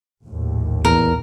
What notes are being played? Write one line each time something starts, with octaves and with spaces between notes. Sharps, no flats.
A#1 D#2 A2
E2 A#4